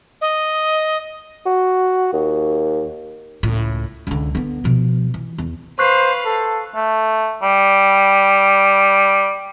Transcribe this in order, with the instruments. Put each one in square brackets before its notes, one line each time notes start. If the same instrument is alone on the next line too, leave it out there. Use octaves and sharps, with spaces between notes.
[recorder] D#5
[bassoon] F#4
D#2
[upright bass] C#2 A2
C#2 D3
D3 B3
B2 F3
E3
E2
[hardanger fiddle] B4 F5 [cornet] C5 [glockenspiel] C#6 F#6 C7
[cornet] A4
[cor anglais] A3
G3